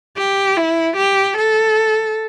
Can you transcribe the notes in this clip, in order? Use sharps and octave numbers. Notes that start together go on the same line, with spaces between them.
G4
E4
G4
A4